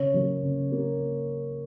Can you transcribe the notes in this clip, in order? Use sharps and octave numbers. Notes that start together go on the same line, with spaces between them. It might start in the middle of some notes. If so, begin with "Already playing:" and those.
Already playing: C#3 C#5
F#3 A#3
C#3
A#3